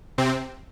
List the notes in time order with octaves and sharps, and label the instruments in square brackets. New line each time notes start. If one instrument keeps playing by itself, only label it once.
[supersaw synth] C3 C4